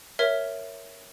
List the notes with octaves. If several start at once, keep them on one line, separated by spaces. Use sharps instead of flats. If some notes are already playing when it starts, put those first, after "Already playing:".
A#4 C#5 E5